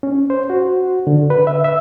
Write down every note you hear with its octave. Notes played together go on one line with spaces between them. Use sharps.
C#4
C5
F#4
D3
B4
E5
E5